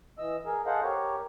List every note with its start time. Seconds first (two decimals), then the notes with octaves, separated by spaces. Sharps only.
0.18 E3 D#5 E6
0.46 G#4 A#4
0.66 G#4 A4 C5 D#5 F5 F#5
0.82 G4 A#4 C#5